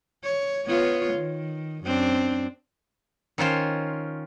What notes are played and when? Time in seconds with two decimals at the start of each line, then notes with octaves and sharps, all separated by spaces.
0.24 C#5
0.68 B3 F4 C#5
1.13 D#3
1.84 F#2 C4 D4
3.38 D#3 C#4 F4 C5